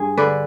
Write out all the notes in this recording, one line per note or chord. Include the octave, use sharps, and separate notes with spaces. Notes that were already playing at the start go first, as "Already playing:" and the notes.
Already playing: G2 G#4
D3 B4 D5